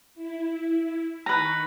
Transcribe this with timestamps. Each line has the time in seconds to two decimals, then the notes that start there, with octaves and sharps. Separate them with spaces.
0.14 E4
1.26 D#3 B4 A#5 C#6